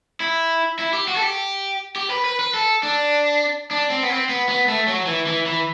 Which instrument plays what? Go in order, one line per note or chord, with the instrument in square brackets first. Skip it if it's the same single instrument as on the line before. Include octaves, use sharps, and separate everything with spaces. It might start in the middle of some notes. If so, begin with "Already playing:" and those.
[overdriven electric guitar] E4
E4
G4
F#4
A4
G4
G4
B4
B4
B4
A4
D4
D4
C4
B3
C4
B3
B3
A3
F#3
E3
E3
E3